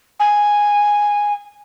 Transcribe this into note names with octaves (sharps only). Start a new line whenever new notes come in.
G#5